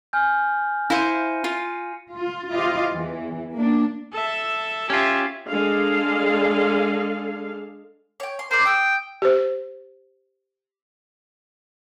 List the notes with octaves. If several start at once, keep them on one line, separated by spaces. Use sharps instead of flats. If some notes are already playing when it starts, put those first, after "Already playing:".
G#5 F6 G6
E4 C5 F5 A#6 C#7 D#7
F4
F4
E4 F4 G4 C5 D#5 F5
E2 E3
A#3 D4
A4 E5
C#4 F4 G4 E5
G#3 D4 A4 F5
C#5 G5
C6
A#4 C5 D5
G5 D#6 E6
G4 C5